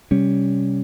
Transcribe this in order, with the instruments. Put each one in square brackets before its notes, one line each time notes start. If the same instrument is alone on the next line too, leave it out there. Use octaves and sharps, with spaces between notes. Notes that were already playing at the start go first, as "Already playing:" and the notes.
[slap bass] C3 G3 C#4